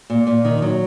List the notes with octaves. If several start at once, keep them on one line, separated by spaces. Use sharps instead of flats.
A#2
A#2
D#3
F#3